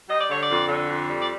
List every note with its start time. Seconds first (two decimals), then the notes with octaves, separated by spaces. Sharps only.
0.09 G3 D#5
0.20 D5
0.29 D3 C#5
0.43 D5
0.49 F2
0.68 D3
0.88 F2
1.09 G3
1.20 D5